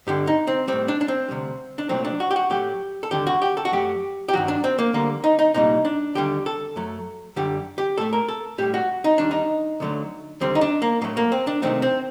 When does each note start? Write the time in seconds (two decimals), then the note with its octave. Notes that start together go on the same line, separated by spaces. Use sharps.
0.07 G2 D3 G3 G4
0.27 D#4
0.47 C4
0.68 A2 G3 C4
0.88 D4
1.01 D4
1.08 C4
1.28 D2 C3 G3
1.78 D4
1.89 C2 A#2 F#3 A3 C4
2.05 D4
2.20 F#4
2.31 G4
2.36 F#4
2.50 A2 F#3 A3 G4
3.03 A4
3.11 D#2 D3 G3 G4
3.27 F#4
3.42 G4
3.57 A4
3.65 F#4
3.72 F#2 F#3 A3 G4
4.29 G4
4.33 G2 D#3 F#3 F#4
4.48 D4
4.64 C4
4.79 A#3
4.93 D2 D3 G3 A#3
5.24 D#4
5.39 D#4
5.54 C2 A#2 G3 D#4
5.85 D4
6.15 D#2 D3 G3 G4
6.46 A4
6.76 F#2 F#3 A3
7.36 F#2 D3 G3 G4
7.78 G4
7.98 A2 A3 A4
8.13 A#4
8.28 A4
8.58 A2 G3 G4
8.74 F#4
9.04 D#4
9.18 D#2 D#3 G3 D4
9.31 D#4
9.80 D2 D3 F#3 A3
10.41 D#2 D3 G3 C4
10.55 D#4
10.61 D4
10.82 A#3
11.02 A2 F#3 A3 A#3
11.17 A#3
11.32 C4
11.47 D4
11.62 C2 C3 D#3 A3 C4
11.82 C4